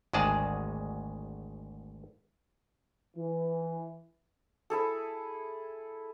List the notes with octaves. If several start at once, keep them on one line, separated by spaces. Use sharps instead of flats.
G#1 D2 G#3 G#4 D5 A5
E3
E4 G#4 A4